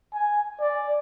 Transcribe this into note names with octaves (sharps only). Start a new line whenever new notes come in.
G#5
D5